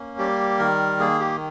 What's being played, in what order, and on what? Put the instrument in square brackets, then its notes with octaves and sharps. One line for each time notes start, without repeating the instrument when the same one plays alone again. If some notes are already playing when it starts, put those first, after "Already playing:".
Already playing: [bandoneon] A#3 C#4
G3 G4
D#3 A#4
A#3 G#4
G4